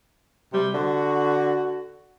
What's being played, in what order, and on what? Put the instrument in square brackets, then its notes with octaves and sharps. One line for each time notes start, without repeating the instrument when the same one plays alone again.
[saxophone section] C3 G3
[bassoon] D3 [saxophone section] F#4